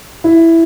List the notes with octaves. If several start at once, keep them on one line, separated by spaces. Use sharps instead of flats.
E4